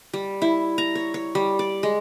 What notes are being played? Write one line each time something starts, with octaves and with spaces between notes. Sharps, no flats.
G3
E4
A#5
C#5
C#5
G3
D5
G#3